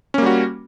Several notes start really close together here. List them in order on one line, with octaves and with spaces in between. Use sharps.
C#4 A#3 G3 F#4